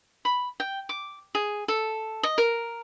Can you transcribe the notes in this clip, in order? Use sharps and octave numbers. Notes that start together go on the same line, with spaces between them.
B5
G5
D6
G#4
A4
D#5
A#4